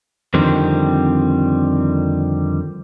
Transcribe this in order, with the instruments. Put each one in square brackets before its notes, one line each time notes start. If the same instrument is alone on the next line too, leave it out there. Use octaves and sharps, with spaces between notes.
[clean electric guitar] F2 D3 D#3 G3 C4